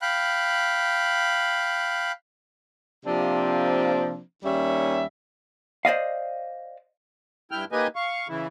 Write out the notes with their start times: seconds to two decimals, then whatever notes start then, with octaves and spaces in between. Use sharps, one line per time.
0.02 F5 G5 B5 F#6
3.05 C3 F3 A#3 C4 D4
4.44 D#2 G3 C#4 E5
5.85 C5 D5 D#5 F5
7.51 G2 E4 G5 F6
7.72 A#3 D#4 G4 B4 D#5 G#5
7.96 F5 C#6
8.29 C#3 E3 E4